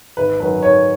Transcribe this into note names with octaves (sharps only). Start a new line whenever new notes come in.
G#1 B4
F#2 D#3 F#3 B4
G#1 C#5